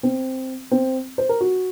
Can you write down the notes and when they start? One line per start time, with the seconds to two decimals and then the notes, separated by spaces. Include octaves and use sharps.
0.03 C4
0.71 C4
1.18 C5
1.29 A#4
1.41 F#4